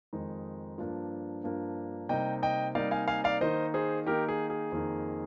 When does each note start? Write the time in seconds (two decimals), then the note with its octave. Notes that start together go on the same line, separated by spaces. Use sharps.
0.13 F2 D#3 G#3 D#4
0.78 G2 F3 A#3 D4
1.44 G2 F3 A#3 D4
2.09 C3 G3 A#3 D#4 D#5 G5
2.43 D#5 G5
2.75 C3 G3 A#3 D#4 D5 F5
2.91 F5 G#5
3.08 F5 G#5
3.24 D5 F5
3.41 D#3 A#3 D#4 C5 D#5
3.74 G#4 C5
4.07 D#3 A#3 D#4 G4 A#4
4.29 G#4
4.50 G#4
4.72 F2 D#3 A#3 D#4